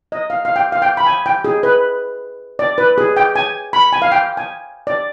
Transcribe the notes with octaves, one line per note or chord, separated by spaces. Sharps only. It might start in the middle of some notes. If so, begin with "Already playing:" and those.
D#5
F5
F5
G5
F5
G5
B5
G#5
G5
G#4
B4
D5
B4
G#4
G5
G#5
B5
G#5
F5
G5
G#5
D5